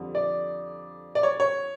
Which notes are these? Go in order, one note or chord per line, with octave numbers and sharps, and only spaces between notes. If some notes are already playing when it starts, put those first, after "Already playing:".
Already playing: F2 D3 G3
D5
D5
C#5
C#5